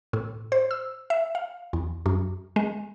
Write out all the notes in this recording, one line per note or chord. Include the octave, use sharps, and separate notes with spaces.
A2
C5
E6
E5
F5
E2
F#2
G#3